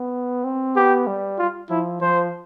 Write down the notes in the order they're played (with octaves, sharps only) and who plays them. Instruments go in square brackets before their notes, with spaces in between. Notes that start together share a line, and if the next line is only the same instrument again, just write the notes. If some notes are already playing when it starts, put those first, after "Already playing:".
Already playing: [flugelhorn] B3
C4
[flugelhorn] B3 [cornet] G4
[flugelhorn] G3
[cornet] F4
[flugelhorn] F3 [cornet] E4
[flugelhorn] F3 [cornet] C5